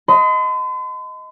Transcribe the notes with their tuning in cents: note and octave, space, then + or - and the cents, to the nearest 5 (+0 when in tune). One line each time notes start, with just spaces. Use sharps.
D#5 +10 C6 -45